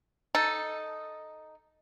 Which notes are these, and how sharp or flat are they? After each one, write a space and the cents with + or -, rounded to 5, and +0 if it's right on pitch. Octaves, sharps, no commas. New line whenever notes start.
D#4 +0 A4 +0